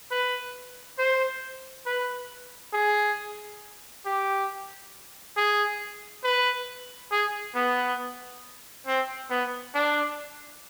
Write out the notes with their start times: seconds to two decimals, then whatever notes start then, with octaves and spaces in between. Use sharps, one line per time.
0.11 B4
0.99 C5
1.86 B4
2.73 G#4
4.06 G4
5.37 G#4
6.24 B4
7.11 G#4
7.55 B3
8.87 C4
9.30 B3
9.74 D4